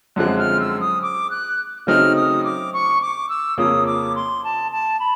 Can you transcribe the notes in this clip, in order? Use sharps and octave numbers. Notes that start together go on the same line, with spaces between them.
F#2 D3 F3 G#3 C4 F#6
F6
E6
D#6
D6
F#6
C#3 F#3 A3 C4 D#4 F6
D#6
D6
C#6
D6
E6
F2 C#3 F3 A#3 C#4 D#6
D6
C6
A5
A5
B5